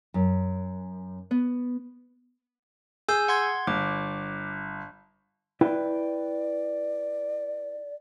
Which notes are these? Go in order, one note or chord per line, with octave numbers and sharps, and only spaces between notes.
F#2
B3
G#4 G#5 E6 G6
F#5 C6 G#6
G1 D6
E4 B4 D5 G5